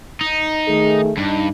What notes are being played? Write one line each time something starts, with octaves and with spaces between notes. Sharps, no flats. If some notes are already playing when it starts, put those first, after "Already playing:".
D#4
D#3 A3 G#4
G2 D#4